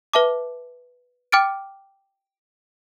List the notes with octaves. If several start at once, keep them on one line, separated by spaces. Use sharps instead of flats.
B4 E5 A5 D6
G5 D6 F6 A6 D7